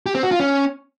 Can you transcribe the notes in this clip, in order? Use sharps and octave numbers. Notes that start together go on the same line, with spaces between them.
G4
C4
F#4
F4
C#4